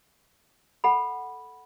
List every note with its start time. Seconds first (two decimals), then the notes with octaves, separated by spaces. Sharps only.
0.84 A4 F#5 B5